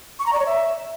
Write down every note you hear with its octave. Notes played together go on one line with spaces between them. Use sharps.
C#6
A#5
D5
C#5
E5